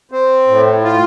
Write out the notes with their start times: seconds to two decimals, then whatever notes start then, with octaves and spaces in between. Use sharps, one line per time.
0.11 C4
0.48 A2
0.84 F4